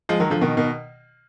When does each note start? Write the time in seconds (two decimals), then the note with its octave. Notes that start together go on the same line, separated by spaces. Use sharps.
0.09 F3 G#3
0.20 D#3 F#3
0.30 D3 F3
0.41 B2 D#3
0.57 B2 D#3